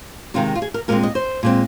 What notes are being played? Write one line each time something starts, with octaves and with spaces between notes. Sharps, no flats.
C3 D#3 G#3 F4
F4
G#4
A#4
A#2 G#3 C4 A#4
D#5
C5
A#2 G#3 C4